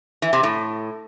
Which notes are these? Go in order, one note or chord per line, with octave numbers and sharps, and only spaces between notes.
E3
C3
A2